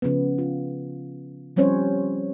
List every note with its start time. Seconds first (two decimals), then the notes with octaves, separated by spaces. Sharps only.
0.02 C#3 F3 B3
0.38 F4
1.56 F3 G3 C4 C#4 C5 C#5